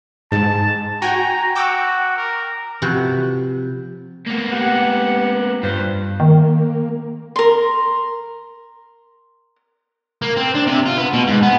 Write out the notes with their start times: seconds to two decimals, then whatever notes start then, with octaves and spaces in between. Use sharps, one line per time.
0.32 G#2 A5
1.02 F#4 G5 G#5 A#5
1.55 F#4 G5 D6 E6
2.17 A#4
2.82 C3 F3 F#4 B4
4.27 A#3 B3
4.52 G4 F#5
5.63 G2 F4 B4 C5
6.20 D#3 A#3
7.36 A#4 C6
10.22 A#3
10.37 C4
10.55 D4
10.67 C3
10.86 F4
10.98 B3
11.14 B2
11.27 G#2
11.43 B3